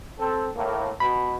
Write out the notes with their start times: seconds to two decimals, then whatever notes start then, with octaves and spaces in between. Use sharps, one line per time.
0.19 C4 A4
0.55 A2 A#3
1.00 B2 B5